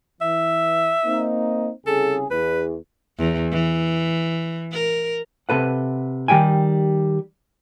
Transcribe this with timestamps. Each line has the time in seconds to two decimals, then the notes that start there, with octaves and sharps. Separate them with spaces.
0.21 E3 E5
1.05 A#3 C4 D#4
1.87 C2 C#3 G#4 A4
2.31 E2 B4
3.19 E2
3.52 E3
4.72 A#4
5.49 C3 A4 B4 F#5
6.28 D#3 G3 G4 G5 G#5